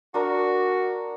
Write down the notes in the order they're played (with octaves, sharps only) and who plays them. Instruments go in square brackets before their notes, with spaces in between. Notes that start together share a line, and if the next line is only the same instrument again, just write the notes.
[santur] D4 A#4 [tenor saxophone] F#4